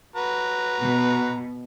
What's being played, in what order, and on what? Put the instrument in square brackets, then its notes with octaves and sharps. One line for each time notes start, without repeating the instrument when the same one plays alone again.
[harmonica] F#4 B4 A#5
[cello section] B2